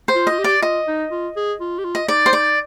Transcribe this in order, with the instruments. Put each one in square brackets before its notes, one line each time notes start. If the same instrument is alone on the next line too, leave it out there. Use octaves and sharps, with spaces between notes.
[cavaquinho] C5
[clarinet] F4
[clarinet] F4 [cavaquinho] D#5
[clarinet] G4
[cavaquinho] D5
[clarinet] F4 [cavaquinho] D#5
[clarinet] D#4
F4
G#4
F4
G4
F4
[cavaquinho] D#5
[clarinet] D#4 [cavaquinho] D5
[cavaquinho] C5
D5